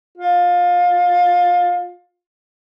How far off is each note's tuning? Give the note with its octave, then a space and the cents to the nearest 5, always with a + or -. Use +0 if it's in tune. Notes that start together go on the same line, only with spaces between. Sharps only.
F4 +20